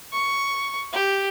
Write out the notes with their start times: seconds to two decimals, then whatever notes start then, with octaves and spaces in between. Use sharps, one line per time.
0.12 C#6
0.93 G4